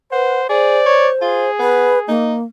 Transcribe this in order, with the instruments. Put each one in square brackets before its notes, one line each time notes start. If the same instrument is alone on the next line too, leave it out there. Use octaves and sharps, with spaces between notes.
[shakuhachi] B4 [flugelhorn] C5 [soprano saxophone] F#5
[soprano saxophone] G#4 [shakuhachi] C5 [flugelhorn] D5
[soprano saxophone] C#5
[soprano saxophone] F4 [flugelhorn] G#4
[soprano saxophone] B3 [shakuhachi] B4
[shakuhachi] A#3 [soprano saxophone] D#4